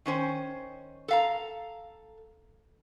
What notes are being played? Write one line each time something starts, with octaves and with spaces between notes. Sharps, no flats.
D#3 C#4 C5 G#5
A4 F5 A#5